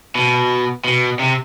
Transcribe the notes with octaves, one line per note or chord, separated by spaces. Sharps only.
B2
B2
C3